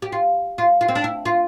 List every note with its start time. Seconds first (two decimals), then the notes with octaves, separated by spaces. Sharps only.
0.02 G4
0.12 F4
0.58 F4
0.81 F4
0.88 C4
0.95 D4
1.04 E4
1.25 F4